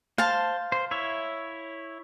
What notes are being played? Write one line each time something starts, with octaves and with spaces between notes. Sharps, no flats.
C5 F5 A5
C5
E4 C#5 E5